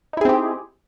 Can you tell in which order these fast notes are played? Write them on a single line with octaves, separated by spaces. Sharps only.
D#4 E4 G#4 C4 G4